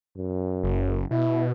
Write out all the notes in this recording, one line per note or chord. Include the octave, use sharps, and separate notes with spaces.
F#2
F#1
B2 E4